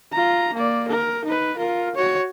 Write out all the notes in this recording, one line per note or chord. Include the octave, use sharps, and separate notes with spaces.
F4 A#5
A#3 D5
A#4
D#4 B4
F4 A#4
F#4 C#5